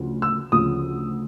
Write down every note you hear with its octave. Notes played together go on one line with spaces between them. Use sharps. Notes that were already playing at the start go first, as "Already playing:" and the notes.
Already playing: D2 C#3 F3
E6
D2 C#3 F3 D#6